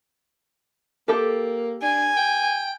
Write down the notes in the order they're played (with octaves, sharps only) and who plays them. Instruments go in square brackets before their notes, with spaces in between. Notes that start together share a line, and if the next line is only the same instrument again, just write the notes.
[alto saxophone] A#3 [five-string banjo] G4 A4
[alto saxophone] D4 [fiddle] G#5
[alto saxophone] G5